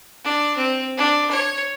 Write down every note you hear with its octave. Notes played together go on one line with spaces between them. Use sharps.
D4
C4
D4
C#5